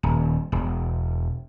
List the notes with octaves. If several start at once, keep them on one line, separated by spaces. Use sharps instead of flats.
D#1
E1